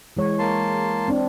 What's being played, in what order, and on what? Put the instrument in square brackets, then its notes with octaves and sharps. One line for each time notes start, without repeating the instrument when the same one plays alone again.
[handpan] E3 G#3 C#5
[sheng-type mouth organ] A#3 A5 C6
[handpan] C4 D4